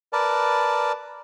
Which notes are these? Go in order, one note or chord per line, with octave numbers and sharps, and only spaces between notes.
A#4 B4 D5 A5